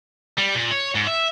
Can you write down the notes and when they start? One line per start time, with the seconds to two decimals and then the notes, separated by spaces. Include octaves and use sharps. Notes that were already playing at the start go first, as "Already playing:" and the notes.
0.38 G3
0.55 A#2
0.71 C#5
0.95 G#2
1.07 E5